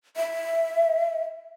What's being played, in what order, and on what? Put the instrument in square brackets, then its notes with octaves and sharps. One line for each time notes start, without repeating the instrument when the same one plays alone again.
[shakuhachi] E5